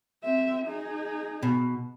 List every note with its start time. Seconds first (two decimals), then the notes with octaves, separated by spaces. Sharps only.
0.24 C4 E5
0.66 D#4 G#4
1.43 B2